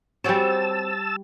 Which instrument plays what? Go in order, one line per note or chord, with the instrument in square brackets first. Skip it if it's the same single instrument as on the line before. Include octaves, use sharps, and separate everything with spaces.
[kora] G3 C#5 [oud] C4 F#4 G#4 [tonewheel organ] A5 E6